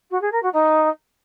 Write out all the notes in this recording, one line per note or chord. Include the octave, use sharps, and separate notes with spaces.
F#4
G#4
A#4
F#4
D#4